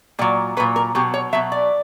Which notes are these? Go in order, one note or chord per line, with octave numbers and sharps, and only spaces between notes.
A#2 F#3 D5
A#2 F#3 B4
A#4
B2 F#3 G4
C#5
B2 F#3 E5
D5